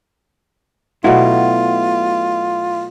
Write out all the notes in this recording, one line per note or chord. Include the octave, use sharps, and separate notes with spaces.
B2 F#3 A3 E4 F4